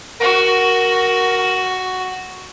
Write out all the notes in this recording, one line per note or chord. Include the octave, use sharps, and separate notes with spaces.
F#4 A#4